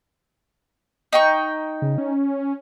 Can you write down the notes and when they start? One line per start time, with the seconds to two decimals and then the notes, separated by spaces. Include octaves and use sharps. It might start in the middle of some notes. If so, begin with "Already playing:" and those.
1.13 D#4 G5 C#6
1.82 C#3
1.98 C#4